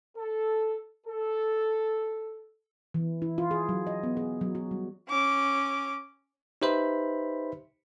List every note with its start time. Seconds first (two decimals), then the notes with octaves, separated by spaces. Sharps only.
0.17 A4
1.07 A4
2.94 E3
3.22 E4
3.38 F4
3.51 G#4
3.69 F#3
3.87 D#5
4.03 B3
4.17 G#4
4.41 F#3
4.55 F#4
4.71 G3
5.09 C#4 D6
6.62 D#4 G4 B4 C5 E5 B5